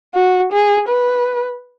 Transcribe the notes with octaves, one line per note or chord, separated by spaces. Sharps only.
F#4
G#4
B4